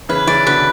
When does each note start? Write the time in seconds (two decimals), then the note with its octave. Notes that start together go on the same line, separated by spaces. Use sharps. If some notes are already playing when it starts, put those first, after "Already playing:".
0.09 C#3 E3 B4
0.27 C#3 E3 D5
0.46 B2 D3 B4